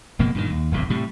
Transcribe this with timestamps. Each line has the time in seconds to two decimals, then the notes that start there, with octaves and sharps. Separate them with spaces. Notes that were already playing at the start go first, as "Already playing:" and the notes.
0.19 F#1 B2 F3 A#3
0.35 G2 A#2 D#3
0.50 D#2
0.72 D1 G#1 E2 C3
0.90 A2 C3 G3